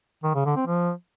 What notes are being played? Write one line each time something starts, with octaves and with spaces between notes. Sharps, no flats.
D#3
C#3
D3
C4
F3